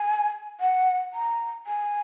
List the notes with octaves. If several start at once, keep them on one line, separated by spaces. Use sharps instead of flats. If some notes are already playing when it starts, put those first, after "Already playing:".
Already playing: G#5
F#5
A#5
G#5